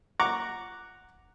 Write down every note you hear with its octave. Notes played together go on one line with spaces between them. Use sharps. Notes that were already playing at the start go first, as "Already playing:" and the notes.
F#5 A#5 C#6 D6